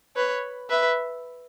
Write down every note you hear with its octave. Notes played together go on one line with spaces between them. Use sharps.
B4 C#5
B4 E5